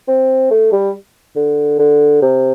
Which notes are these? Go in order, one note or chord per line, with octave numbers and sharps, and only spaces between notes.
C4
A3
G3
D3
D3
C3